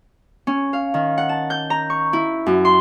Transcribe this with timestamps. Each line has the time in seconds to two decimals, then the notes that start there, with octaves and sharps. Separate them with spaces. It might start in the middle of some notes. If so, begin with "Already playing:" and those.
0.47 C#4
0.73 F5
0.94 D#3
1.18 F#5
1.29 A5
1.50 G6
1.70 A#5
1.90 C#6
2.13 E4
2.46 F#2
2.65 C6